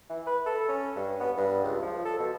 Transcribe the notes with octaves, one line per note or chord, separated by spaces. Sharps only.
E3
B4
A4
C#4
G2
B3
G2
C#2
F3
A4
B2